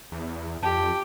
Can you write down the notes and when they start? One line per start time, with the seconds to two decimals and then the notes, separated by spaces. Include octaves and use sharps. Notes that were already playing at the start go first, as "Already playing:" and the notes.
0.12 E2
0.63 F2 G4 A5